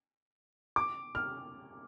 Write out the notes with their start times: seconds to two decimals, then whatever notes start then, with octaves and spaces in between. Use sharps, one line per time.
0.76 D6
1.15 F6